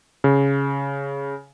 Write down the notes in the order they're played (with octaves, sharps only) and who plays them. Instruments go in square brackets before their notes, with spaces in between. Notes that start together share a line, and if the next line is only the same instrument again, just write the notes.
[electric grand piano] C#3